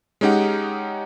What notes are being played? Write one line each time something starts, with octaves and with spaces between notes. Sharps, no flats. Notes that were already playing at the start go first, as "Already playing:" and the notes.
G#3 C#4 D#4 G4 F#5